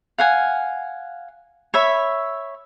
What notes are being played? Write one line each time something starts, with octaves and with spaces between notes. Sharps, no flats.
F5 F#5 G#5
C#5 E5 B5